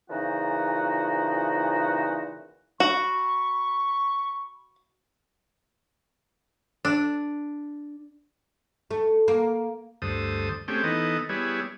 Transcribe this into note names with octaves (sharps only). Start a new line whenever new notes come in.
A#2 C#3 E3 F3 D#4 F#4
F#4 B5 C#6
D4
A3
A#3
D2 G2 A4 C5 D#6
A3 C4 C#4 G4 G#4 G5
E3 B3 D#4 A4 D#5
G3 B3 E4 G#4 C#5